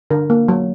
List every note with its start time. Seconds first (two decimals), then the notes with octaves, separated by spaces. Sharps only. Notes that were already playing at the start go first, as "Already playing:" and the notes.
0.11 D3 A#4
0.30 A#3
0.48 F#3